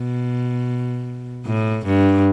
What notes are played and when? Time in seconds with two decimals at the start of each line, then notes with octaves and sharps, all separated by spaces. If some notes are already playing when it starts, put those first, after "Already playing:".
Already playing: B2
1.46 A2
1.85 G2